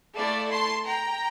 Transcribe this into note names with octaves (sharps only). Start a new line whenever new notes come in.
A3 E4 A4 D5 F5
A5 C6
G5 A#5